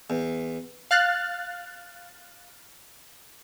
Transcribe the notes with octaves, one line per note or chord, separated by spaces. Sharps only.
E2
F5 F6 F#6 A6